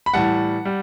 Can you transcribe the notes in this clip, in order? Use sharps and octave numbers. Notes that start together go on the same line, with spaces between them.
B5
A2 E3 G3 F#5 A5
G3